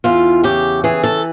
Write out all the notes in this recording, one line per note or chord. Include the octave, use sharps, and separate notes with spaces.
E2 F4
C#3 G4
E3 G#4
A4